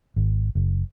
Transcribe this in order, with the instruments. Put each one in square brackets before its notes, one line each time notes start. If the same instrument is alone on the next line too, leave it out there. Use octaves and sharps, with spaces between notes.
[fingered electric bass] G#1
F#1